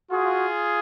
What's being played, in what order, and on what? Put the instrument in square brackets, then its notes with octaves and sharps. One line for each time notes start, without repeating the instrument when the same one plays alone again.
[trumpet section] F4 G#4 [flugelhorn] F#4